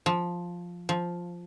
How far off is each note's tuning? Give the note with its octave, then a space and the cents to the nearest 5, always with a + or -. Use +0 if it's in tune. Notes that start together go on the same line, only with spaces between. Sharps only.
F3 +5
F3 +0